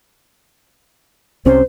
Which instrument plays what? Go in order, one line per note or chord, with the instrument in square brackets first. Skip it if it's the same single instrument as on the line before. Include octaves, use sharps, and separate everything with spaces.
[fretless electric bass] C2 C3 C#4 [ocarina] C5